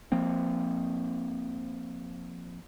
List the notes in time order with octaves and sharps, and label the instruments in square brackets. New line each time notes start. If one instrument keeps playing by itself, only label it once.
[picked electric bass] F3 A#3 C4